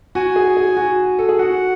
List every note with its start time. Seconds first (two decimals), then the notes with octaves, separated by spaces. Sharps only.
0.15 F#4 G#5
0.36 G#4
0.57 G#4
0.77 F#4
1.19 A4
1.29 G#4
1.39 F#4 F#5